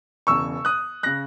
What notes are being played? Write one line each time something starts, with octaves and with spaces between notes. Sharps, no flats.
E1 E2 C#3 C#6 E6
D#6 F#6
C#3 F#6 A#6